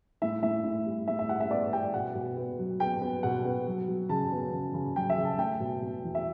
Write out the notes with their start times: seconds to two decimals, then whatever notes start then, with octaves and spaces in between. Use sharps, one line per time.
0.22 A2 E5
0.43 A2 E5
0.64 A2
0.86 G3
1.07 A2 E5
1.19 E5
1.29 G3 F#5
1.40 E5
1.50 B3 D5
1.72 G3 G5
1.94 B2 F#5
2.15 B2
2.37 B3
2.58 F#3
2.80 B3 G5
3.01 B3
3.23 B2 F#5
3.45 B3
3.67 F#3
3.88 F#3
4.09 C#3 A5
4.32 B3
4.52 C#3
4.74 C#3
4.96 F#3 G5
5.10 E5
5.17 C#3
5.25 A5
5.38 A3 G5
5.60 B2
5.82 B2
6.03 E2
6.15 E5